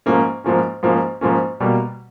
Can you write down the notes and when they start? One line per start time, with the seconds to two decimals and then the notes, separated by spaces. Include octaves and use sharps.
0.06 G#2 F3 A#3 C#4
0.44 G#2 F3 A#3 C#4
0.83 G#2 F3 A#3 C#4
1.21 G#2 F3 A#3 C#4
1.60 B2 G3 A#3